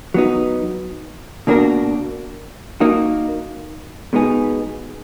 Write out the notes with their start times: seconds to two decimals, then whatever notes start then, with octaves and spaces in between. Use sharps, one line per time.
0.14 F#3 B3 D#4
1.47 B2 A#3 D4 F#4 A#4
2.80 A#3 D#4 F#4
4.13 B2 G#3 B3 D#4 G#4